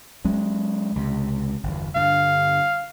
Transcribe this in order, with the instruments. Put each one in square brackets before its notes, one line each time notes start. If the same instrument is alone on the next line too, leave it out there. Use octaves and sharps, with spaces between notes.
[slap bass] F#3 G#3 C#4
C#2 C3
G1 E2
[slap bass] G2 D3 [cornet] F5